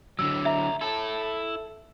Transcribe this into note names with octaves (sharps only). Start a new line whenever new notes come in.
D3 F#3 E6
D2 E5 A#5
E4 A4 A5